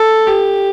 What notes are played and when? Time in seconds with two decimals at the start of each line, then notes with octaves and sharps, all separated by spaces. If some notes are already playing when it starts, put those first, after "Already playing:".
Already playing: A4
0.27 G4